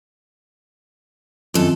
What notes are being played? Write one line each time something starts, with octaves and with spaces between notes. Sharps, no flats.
F#2 D#3 C4 F4 A4